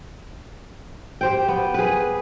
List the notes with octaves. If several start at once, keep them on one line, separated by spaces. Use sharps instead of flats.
G4 C5 G5
B3
G#4 B4